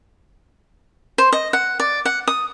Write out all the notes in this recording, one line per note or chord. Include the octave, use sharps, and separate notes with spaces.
C5
D#5
F#5
D5
F#5
D#6